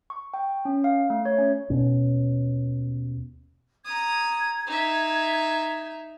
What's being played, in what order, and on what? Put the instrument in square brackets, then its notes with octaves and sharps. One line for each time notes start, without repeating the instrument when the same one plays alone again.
[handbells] C#6
G5
C#4
F5
A3
C#5
C#4
[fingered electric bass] D#2 B2 C#4
[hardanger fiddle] A#5 D#6 [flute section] G#6
[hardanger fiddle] D#4 E5